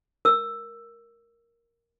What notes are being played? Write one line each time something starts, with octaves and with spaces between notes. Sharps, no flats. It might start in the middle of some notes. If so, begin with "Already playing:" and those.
A#4 E6